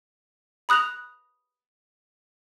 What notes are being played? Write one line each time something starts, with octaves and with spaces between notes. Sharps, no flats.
B5 D#6 F#6 A#6 F7